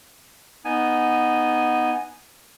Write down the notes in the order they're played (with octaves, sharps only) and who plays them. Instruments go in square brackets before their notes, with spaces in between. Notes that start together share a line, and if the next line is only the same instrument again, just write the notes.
[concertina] B3 D#4 G#5